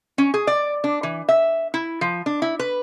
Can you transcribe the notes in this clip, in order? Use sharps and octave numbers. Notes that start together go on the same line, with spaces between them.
C#4
G#4
D5
D4
E3
E5
E4
F3
D4
E4
B4